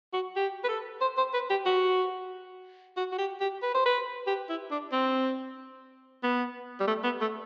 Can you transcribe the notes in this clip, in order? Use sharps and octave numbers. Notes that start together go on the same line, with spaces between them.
F#4
G4
B4
A4
C5
C5
B4
G4
F#4
F#4
F#4
G4
G4
B4
C5
B4
G4
E4
D4
C4
B3
G3
A3
B3
A3